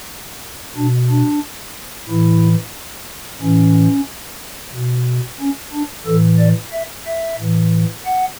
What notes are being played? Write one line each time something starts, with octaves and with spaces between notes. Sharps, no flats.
B2 D4
D4
A2 E3 E4
A2 E3 C#4
B2
C#4
D4
A2 E3 A4
D5
E5
E5
A2 E3
F#5